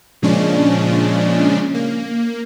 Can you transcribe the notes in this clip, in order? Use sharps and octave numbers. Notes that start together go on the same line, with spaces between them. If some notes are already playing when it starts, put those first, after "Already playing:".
A#2 C#3 F3 G#3 C#4 D4
A#3